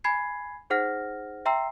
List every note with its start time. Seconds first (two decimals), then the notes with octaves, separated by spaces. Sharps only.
0.04 G#5 B5 G#6 C7
0.70 D#4 G#4 C5 F#5 F6 A#6
1.46 E5 G5 A#5 C6 E6 C7